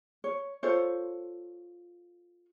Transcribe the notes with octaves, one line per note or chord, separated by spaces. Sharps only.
C#5
F4 A4 C5 C#5